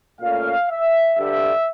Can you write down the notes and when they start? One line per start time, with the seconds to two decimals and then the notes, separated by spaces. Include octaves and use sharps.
0.20 A#2 A3 C#4 F5
0.69 E5
1.18 G2 D3 G3 E5